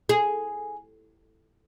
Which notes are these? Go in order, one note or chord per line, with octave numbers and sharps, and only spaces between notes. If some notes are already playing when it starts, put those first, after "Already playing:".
G#4